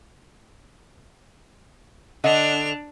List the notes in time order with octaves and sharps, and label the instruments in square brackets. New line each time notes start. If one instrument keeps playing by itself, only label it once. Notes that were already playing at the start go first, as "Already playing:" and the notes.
[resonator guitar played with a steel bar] D3 D#5 F#5 [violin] D4 F7